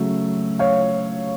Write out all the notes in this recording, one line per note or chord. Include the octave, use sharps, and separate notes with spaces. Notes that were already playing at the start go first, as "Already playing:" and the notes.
Already playing: C#3 F#3 A3
C#5 F5